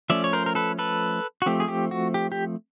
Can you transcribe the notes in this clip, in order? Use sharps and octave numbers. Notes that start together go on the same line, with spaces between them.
F3 A3 C#4 D5 E5
C#5
A#4 C5
A#4
A4 B4
A4 B4
F#4
F3 A3 C4 G4
G#4
G4
F#4
G4
G4